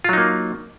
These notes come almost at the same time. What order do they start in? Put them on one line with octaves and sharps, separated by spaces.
F4 F#3 D#4 A#3